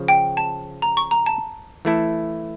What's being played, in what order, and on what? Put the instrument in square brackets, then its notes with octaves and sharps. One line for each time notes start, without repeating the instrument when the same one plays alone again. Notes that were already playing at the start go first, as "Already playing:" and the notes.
Already playing: [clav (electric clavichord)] C#3 F3
[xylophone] G5
A5
A#5
C#6
A#5
A5
[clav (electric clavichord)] E3 A3 E4 A4